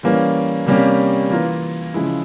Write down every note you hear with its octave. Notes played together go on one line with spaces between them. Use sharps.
E3 G3 A#3 C#4
C3 G3 A#3 C#4 G4
E3 A#3 F4 A#4
C#3 F3 G#3 E4